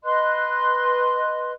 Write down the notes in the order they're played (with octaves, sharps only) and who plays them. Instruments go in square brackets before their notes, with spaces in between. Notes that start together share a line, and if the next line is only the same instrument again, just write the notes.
[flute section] B4 D#5 C6 F#6